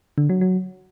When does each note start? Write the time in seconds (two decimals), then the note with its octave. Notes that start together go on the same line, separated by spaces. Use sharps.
0.18 D3
0.29 F#3
0.41 F#3